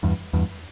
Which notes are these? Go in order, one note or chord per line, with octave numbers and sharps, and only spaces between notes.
E2 G2
E2 G2